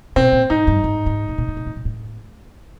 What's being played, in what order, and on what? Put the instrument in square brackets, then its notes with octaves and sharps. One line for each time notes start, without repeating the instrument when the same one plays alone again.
[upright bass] B2 [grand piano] C4
[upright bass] A#2
[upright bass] G#2 [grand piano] D#4
[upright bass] G2
G#2
G#2
A2
A#2
A2
A#2
A2
A#2
A2